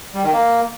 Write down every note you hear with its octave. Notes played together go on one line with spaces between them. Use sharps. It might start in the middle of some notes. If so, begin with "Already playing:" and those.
G3
D#3
A#3